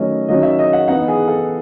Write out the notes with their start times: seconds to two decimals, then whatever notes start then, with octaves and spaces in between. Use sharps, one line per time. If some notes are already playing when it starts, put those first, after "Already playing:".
Already playing: D#3 F#3 A3 C#4 D#5
0.29 D#3 F#3 C#4 D#5
0.43 E5
0.59 D#5
0.73 F#5
0.88 E3 B3 D#4 F#5
1.08 G#4
1.28 A4